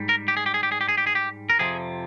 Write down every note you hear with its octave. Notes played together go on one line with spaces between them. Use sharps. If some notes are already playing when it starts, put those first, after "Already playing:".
Already playing: G#2 G3
A#4
G4
G#4
G4
G#4
G4
G#4
G4
G#4
G4
G#4
G4
A#4
F2 C3 F3 G#4